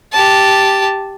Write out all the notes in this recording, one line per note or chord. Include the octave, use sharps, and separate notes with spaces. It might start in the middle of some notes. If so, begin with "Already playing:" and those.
G4 A5